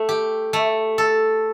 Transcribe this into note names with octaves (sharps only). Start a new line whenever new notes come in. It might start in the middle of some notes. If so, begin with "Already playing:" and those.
Already playing: A3
G4
A3
A4